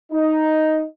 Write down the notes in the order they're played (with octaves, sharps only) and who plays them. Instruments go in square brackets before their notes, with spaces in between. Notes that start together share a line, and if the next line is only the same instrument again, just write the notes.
[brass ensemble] D#4